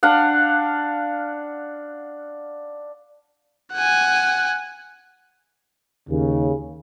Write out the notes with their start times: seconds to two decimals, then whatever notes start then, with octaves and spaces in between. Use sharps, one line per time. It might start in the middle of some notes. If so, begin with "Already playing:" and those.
0.03 D4 F5 F#5
3.73 F#5 G#5
6.10 D#2 C#3